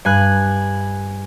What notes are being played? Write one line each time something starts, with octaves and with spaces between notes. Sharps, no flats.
G2 G#5 F#6